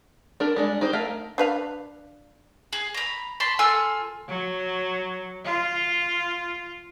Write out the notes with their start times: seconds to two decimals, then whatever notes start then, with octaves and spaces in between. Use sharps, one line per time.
0.40 D4 A#4 B4
0.56 G3 G#3 D4
0.81 D#4 G4 C5
0.93 A3 A#4 E5 F5
1.38 D4 B4 F5
2.73 G#4
2.94 A#5 B5
3.40 A5 B5 C6
3.59 F4 A4 G#5 E6
4.28 F#3
5.44 F4